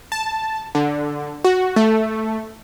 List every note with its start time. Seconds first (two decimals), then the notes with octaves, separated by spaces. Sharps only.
0.12 A5
0.75 D3
1.45 F#4
1.76 A3